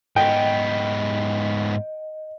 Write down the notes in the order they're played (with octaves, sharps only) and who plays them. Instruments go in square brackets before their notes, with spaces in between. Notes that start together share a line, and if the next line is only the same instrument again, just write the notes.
[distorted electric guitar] G#2 B3 [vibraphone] D#5 [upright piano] G5